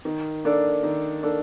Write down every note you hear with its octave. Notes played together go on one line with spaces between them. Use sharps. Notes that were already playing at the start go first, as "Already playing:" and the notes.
D#3
A#3 D4 A4 D5
D#3
A#3 D4 A4 D5